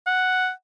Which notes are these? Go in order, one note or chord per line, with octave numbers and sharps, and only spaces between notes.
F#5